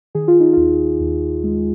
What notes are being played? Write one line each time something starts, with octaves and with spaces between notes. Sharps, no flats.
D#3 G#4
F4
D#4
D#2 F4
D#2
G#3